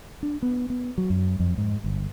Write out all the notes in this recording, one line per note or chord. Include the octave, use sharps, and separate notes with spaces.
D4
B3
B3
F#3
F#2
F2
G#2
G1